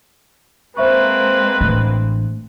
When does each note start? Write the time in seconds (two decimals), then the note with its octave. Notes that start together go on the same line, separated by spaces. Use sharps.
0.77 G#3 A#3 C4 B4 C5 E5 C#6
1.61 A1 D4